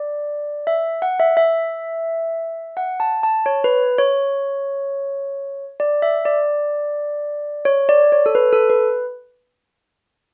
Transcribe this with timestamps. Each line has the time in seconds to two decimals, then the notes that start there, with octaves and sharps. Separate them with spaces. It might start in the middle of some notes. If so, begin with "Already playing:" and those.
Already playing: D5
0.67 E5
1.02 F#5
1.20 E5
1.37 E5
2.77 F#5
3.00 A5
3.23 A5
3.46 C#5
3.64 B4
3.98 C#5
5.80 D5
6.02 E5
6.25 D5
7.65 C#5
7.89 D5
8.12 C#5
8.26 A4
8.35 B4
8.53 A4
8.70 B4